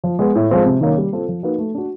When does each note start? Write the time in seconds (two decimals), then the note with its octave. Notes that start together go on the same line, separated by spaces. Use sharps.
0.04 F3
0.19 G#3 B3
0.35 A2
0.50 F3 G#3 C4 F4
0.66 C3
0.81 D#3 F#3 A#3 C#4
0.97 G3
1.13 C4 F4 A4
1.28 F3
1.43 A#3 D#4 F#4 B4
1.58 A3
1.74 D4 F#4